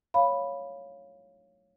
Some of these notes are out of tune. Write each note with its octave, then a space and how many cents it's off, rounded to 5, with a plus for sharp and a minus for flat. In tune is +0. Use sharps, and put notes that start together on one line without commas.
C#5 +0 F5 +0 B5 +0